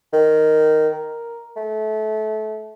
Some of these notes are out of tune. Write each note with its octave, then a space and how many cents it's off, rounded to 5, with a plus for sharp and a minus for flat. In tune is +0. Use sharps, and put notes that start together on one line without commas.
D#3 -5
A#4 +0
A3 -25